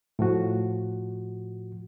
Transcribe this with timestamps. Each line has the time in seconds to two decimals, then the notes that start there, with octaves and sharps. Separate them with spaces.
0.19 A2 F3 F#4